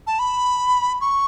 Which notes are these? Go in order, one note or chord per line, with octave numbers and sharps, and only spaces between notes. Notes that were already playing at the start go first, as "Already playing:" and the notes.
A5
B5
C#6